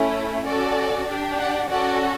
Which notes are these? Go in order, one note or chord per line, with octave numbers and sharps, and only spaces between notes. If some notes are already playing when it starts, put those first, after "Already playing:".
Already playing: A3 C#4 E4
C#4 F#4 A4 D5
D4 G4
D5 F#5
C#4 F#4 A4 D5 F#5